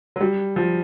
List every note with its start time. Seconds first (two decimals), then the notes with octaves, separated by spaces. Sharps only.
0.16 F#3
0.21 G3
0.56 F3